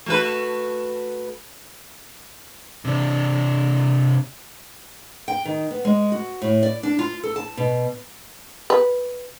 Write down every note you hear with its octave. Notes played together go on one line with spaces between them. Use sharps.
A3 F#4 B4
C3 D4
G5
D#3
B3
G#3
F#4
A2
D5
D4
F4
A4
A5
B2
B4